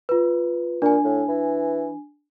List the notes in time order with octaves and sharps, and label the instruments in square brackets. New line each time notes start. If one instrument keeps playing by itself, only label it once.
[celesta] F4 B4
[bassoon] A#2 [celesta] D4 G#5
[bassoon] A2
E3